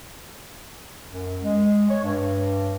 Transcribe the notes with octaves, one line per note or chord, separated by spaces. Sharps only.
F#2
G#3
C#5
G2